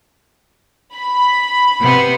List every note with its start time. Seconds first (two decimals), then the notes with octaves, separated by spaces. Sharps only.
0.95 B5
1.80 C3 B3